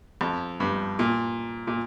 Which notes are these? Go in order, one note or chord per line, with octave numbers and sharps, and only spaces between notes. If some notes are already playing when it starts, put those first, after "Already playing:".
F2
G2
A#2
A#2